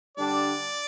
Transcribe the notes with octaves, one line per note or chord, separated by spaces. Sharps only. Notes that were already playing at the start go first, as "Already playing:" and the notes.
D3 G3 D4 D5